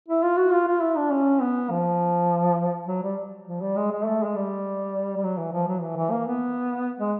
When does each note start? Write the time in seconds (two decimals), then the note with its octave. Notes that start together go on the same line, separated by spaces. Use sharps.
0.08 E4
0.23 F4
0.37 F#4
0.53 F4
0.67 F4
0.82 E4
0.96 D4
1.12 C#4
1.41 B3
1.70 F3
2.87 F#3
3.02 G3
3.47 F3
3.61 G3
3.77 G#3
3.91 G#3
4.05 A3
4.24 G#3
4.35 G3
5.17 G3
5.23 F#3
5.38 E3
5.52 F3
5.67 F#3
5.81 E3
5.96 E3
6.11 A#3
6.27 B3
6.99 G#3